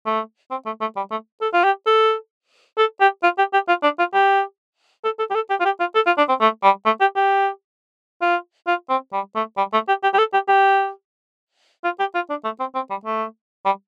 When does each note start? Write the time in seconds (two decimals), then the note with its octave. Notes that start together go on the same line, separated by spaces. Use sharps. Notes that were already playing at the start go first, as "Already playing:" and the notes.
0.06 A3
0.51 C4
0.66 A3
0.81 A3
0.96 G3
1.11 A3
1.41 A4
1.53 F4
1.64 G4
1.86 A4
2.78 A4
3.00 G4
3.23 F4
3.38 G4
3.53 G4
3.68 F4
3.83 D4
3.98 F4
4.14 G4
5.04 A4
5.19 A4
5.30 G4
5.35 A4
5.50 G4
5.60 F4
5.65 G4
5.80 F4
5.95 A4
6.06 F4
6.18 D4
6.29 C4
6.41 A3
6.63 G3
6.86 A3
7.00 G4
7.16 G4
8.22 F4
8.67 F4
8.89 C4
9.13 G3
9.35 A3
9.57 G3
9.73 A3
9.88 G4
10.03 G4
10.14 G4
10.18 A4
10.33 G4
10.48 G4
11.84 F4
11.99 G4
12.15 F4
12.30 D4
12.44 A3
12.60 C4
12.75 C4
12.90 G3
13.05 A3
13.65 G3